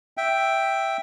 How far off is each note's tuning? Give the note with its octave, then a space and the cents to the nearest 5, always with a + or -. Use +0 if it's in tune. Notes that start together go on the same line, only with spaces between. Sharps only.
E5 +0 G5 +0